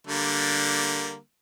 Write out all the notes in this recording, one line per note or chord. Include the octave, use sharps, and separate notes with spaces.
D3 G3 A#3